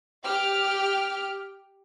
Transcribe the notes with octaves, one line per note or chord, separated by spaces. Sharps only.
G4 G5 F6